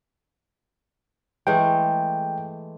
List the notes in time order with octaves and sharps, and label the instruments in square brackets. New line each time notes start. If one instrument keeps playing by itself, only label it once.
[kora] E3 G#3 A3 [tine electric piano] G5